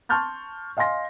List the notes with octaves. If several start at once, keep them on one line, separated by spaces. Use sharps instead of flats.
A5 C6 C#6 F6 G6 A6
D#5 F5 G#5 C6 A#6